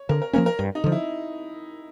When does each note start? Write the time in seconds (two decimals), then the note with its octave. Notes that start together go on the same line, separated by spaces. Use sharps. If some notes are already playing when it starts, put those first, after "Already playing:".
Already playing: C#5
0.09 D3 A#4
0.22 A#4
0.33 F3 A#3 C#4 A#4
0.46 A#4
0.59 G2
0.75 D#4
0.84 D3 F3
0.92 E4